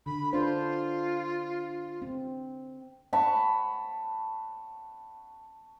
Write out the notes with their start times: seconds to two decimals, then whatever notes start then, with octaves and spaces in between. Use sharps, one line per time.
0.06 D3 B5
0.33 D4 F4 C5
2.02 C4
3.13 F#5 A5 B5 C#6